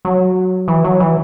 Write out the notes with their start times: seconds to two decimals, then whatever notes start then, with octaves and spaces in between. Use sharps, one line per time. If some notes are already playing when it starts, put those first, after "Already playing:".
0.05 F#3
0.68 E3
0.84 F#3
1.00 E3